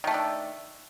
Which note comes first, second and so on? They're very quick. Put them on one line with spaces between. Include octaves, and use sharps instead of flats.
D#3 A3 A4 D4